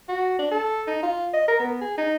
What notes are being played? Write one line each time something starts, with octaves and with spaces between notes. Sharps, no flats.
F#4
D4
A4
D#4
F4
D#5
A#4
B3
G#4
D#4